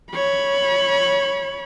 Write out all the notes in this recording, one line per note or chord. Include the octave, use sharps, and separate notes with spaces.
C#5 B5